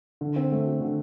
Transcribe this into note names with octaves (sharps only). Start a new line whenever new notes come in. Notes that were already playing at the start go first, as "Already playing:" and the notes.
D3
C4
A3
F#4
D3